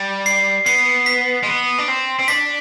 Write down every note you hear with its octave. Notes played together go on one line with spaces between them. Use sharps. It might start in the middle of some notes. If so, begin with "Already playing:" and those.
Already playing: G3
C7
B3 C7
B6
G#3
B3
D4
C4
C4
D4 B6